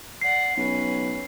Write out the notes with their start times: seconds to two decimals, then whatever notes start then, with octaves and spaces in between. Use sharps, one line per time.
0.22 D5 F#5 C7
0.57 B1 C#4 B4